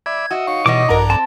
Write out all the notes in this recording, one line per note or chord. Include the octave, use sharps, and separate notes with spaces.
D5 E5 B5 G#6
F#4 D#5 E5
D#4 C#5 F5 C#6
B2 E3 G3 B3 D#5 D6
A#1 G2 F#4 A4 A#4 D5 A#5
C4 A5